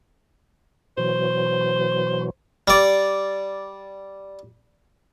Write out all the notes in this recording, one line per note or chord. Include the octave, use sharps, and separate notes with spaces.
B2 E3 F#3 C5
G3 D5